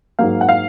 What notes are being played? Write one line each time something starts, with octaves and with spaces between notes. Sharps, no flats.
G#2 F#3 A#3 F5
F#5
F5